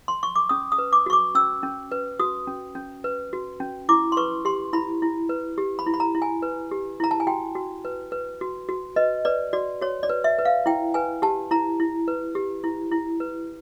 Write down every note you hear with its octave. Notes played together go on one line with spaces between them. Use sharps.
C6
C#6
D6
C#4 D#6
D#6
B4
D6
F#4 C#6
D6
C#4 E6
C#4
B4
F#4 D#6
C#4
C#4
B4
F#4
C#4
E4 D6
C6
B4 C#6
G4 C6
E4 B5
E4
B4
G4
B5
E4
B5
A#5
E4
G#5
B4
G4
E4 A#5
A5
G#5
F#4 G5
F#4
B4
B4
F#4
F#4
B4 D#5
B4 D5
F#4 D5
F#4 C#5
D5
B4
E5
B4
F5
E4 G5
B4 G#5
G4 A5
E4 A#5
E4
B4
G4
E4
E4
B4